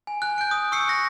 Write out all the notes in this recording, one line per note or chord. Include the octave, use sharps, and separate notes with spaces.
G#5
G#5 F#6
G6 D7
D#6
C#6 E6 F#6 C7 C#7
A#6